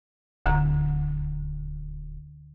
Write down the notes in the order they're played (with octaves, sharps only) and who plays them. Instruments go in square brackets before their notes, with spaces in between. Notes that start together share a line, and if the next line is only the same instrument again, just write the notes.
[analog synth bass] D#1 [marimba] D2 D3 A#5